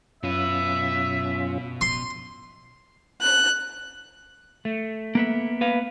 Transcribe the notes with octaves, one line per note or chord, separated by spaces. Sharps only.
F#2 B2 C#4 F4 B4 E5
C6
F#6
A3
A#3 B3 E5
B4 F5